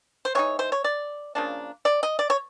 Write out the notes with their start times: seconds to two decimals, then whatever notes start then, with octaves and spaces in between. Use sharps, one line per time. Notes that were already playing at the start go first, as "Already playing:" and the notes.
0.25 C5
0.35 E3 G#3 C4 D#4 C#5
0.59 C5
0.72 C#5
0.84 D5
1.35 C#3 F3 A#3 D4
1.85 D5
2.03 D#5
2.19 D5
2.30 C#5